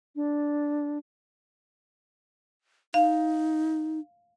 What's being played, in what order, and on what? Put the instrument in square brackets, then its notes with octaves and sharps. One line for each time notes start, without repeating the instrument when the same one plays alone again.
[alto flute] D4
[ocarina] D#4 [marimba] F5